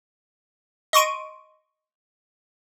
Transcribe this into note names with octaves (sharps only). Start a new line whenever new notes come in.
D#5 C6 C#6 D7 D#7